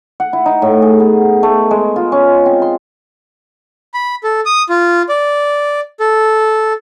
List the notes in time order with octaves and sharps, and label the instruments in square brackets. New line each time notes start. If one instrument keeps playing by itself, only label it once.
[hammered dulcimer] F#5
E4
D#4
A2
G#4
B3
A3
G#3
F4
C#4
C4
C6
[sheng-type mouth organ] B5
A4
D#6
F4
D5
A4